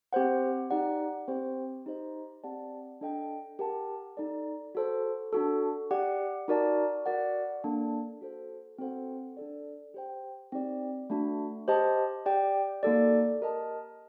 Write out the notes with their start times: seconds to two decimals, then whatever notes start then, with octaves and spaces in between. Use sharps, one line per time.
0.13 C4 G4 C5 F#5
0.71 D#4 G4 D5 F#5
1.28 C4 G4 C5
1.86 D#4 G4 C5 D#5
2.44 C4 G4 D5 F#5 A5
3.01 D4 A4 D#5 G5
3.59 G4 A#4 F#5 A5
4.17 D#4 A4 D5
4.75 F#4 A4 C5
5.33 D4 F#4 A4
5.91 G4 D5 F#5
6.48 D#4 F#4 A#4 D5 A5
7.06 F#4 A#4 D5 F#5
7.64 A#3 D4 A4
8.21 F#4 A4 C5
8.78 C4 F#4 A4 C5 F#5
9.37 D4 A4 D5
9.94 G4 C5 G5
10.52 C4 D#4 G4 D5
11.10 A3 D4 F#4
11.68 G4 C5 D#5 A5
12.26 G4 D5 G5
12.83 A#3 D#4 F#4 A4 D5
13.41 G4 A#4 D#5 A5